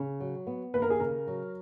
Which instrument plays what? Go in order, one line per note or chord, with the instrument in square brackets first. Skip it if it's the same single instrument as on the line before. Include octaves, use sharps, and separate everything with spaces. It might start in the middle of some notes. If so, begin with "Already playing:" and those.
Already playing: [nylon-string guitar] C#3
F#3
B3
[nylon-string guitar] D#2 [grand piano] B4
[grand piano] A#4
G#4
[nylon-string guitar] C#3 [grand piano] A#4
[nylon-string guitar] F#3